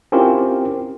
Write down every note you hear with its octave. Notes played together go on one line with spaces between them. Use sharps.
C4 C#4 E4 F4 G4 A#4